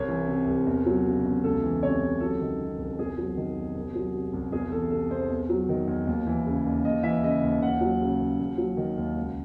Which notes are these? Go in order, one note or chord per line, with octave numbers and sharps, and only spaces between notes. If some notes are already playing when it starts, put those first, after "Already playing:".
Already playing: C2 C#5
E3
C3
C2
E2
F#3
C#3
E2
C#2 A4
E3
C3 C#5
C#2
F#3 A4
D#3
C3
C2
E2 G#4
F#3
D#3
E2
C2
F#3
C3
C2
E2 G#4
E3 A4
C3 A4
E2 C5
E2
F#3
D#3
E2
D#2
E3
C#3
D#2
D#2 D#5
E3 E5
C#3 D#5
D#2
D#2 F#5
F#3
C#3
D#2
D#2
F#3
D#3
D#2
C#2